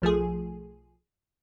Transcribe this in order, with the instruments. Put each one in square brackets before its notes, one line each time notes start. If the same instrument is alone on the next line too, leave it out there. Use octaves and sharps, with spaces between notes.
[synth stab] B1 F3 A3 G#4